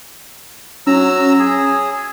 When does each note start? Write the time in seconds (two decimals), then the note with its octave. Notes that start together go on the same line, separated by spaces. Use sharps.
0.87 F#3 C#4 A#5 E6
1.39 G#4 G#6